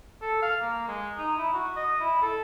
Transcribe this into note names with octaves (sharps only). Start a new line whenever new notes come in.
A4
F5
A#3
G#3
D#4
E4
F#4
D#5
E4
A4